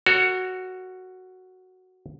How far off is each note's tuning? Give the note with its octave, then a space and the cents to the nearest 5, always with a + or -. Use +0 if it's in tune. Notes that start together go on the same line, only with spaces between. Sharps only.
F#4 +0 A#4 -40 C#5 +0